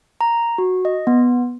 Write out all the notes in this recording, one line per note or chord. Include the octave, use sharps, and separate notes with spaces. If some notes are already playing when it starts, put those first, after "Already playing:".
A#5
F#4
D#5
B3